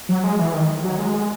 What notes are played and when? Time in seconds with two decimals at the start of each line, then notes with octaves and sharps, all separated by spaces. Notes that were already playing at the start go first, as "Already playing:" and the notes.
0.09 F#3
0.24 G#3
0.39 E3
0.54 D#3
0.84 F#3
0.98 G#3
1.14 G#3